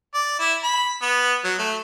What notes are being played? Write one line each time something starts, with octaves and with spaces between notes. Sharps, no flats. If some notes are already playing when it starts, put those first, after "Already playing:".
D5
E4
B5
B3
F#3
A3